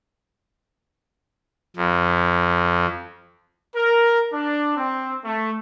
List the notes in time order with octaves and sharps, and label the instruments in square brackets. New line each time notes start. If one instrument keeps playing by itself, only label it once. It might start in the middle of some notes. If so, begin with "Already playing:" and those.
[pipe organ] F2
[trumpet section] A#4
D4
C4
A3